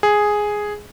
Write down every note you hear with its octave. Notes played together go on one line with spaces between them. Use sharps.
G#4